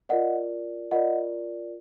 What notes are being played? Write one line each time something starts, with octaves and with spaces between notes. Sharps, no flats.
F4 A#4 D5 D#5 F#5
F4 A#4 D5 D#5 F#5